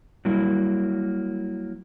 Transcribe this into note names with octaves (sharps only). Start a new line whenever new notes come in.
F#3 G3 A#3 E4